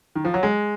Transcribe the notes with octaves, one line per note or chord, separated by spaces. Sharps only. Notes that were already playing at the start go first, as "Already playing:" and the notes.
D#3
F3
F#3
G#3